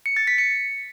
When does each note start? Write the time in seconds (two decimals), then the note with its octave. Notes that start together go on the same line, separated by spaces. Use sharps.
0.06 C#7
0.17 A6
0.27 B6
0.38 C#7